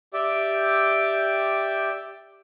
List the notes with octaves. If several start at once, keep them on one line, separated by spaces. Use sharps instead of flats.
G4 D5 E5 G5